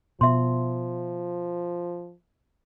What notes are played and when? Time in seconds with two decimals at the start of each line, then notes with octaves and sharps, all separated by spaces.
0.21 B2 F3 E5 C6